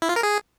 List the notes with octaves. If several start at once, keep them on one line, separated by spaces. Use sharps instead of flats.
E4
F4
A#4
G#4